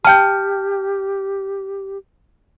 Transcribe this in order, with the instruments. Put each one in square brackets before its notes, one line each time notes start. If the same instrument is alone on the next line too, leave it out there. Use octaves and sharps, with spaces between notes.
[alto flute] G4 [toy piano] G5 A5 [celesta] F6 G6